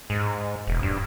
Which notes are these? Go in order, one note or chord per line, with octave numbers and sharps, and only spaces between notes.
G#2
E1
G2